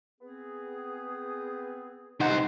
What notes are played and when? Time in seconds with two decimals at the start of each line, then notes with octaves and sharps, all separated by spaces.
0.21 B3 C4 G#4
2.20 C2 D#4 G4 C5 F#5 A#5